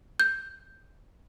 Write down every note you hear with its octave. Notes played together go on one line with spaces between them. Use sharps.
G6